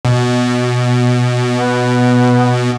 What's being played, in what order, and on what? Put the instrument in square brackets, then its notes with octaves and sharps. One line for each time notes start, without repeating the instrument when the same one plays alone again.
[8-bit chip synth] B2
[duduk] B3